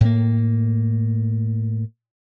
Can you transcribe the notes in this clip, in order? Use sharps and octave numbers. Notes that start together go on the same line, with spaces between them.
A2 A#3